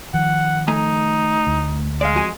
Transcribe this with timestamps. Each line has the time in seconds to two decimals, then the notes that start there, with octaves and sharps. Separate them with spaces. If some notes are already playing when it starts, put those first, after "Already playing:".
0.14 D#3 F3 F#5
0.68 A3 D#4 G#5 A#5
1.47 D2
2.01 G#3 D5 F5
2.15 F2 F#4 G#5